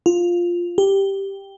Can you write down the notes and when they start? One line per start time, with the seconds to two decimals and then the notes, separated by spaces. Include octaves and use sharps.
0.06 F4
0.78 G4